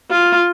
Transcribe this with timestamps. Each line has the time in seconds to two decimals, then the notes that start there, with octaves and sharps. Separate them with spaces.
0.11 F4